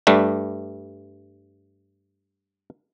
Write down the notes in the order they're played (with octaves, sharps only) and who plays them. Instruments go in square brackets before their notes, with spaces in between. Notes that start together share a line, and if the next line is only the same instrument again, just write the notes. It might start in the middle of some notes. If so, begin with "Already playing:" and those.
[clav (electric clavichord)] G2 G3 A3